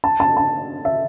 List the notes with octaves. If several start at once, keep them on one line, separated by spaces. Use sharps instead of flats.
A5
A5
A5
E5